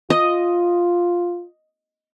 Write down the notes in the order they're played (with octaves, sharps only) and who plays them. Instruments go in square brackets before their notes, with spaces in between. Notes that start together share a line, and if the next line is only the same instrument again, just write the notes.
[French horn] F4 [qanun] D#5